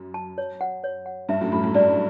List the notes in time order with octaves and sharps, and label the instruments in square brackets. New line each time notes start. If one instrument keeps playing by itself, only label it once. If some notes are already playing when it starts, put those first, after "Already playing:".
Already playing: [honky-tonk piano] F#2
[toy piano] A5
C#5
F#5
C#5
F#5
[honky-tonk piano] G2 [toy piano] E5
[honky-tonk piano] F#2 A2
[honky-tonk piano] F#2 A2 [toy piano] B5
[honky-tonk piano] F#2 A2
[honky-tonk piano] G2 [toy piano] D5